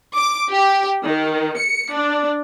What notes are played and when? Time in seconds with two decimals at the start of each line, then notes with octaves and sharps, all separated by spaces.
0.16 D6
0.51 G4
1.04 D#3
1.57 C#7
1.92 D4